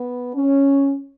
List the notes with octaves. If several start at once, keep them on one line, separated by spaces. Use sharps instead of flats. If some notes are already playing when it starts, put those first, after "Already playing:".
Already playing: B3
C#4